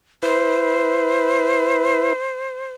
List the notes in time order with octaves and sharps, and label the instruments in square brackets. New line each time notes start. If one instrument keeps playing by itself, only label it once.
[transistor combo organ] E4 B4 [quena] C5